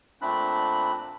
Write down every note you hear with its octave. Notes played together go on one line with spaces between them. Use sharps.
A#2 A3 C4 D4 B5 F#6